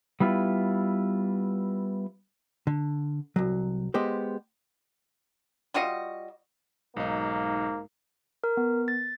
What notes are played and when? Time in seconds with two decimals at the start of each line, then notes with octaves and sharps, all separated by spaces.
0.20 G3 B3 E4 F4
2.67 D3
3.36 C2 F#3
3.94 G#3 B3 G4 C5
5.74 G3 F4 F#4 D#5
6.96 B1 G#2 A#3 D#4
8.44 A#4
8.57 B3
8.88 A6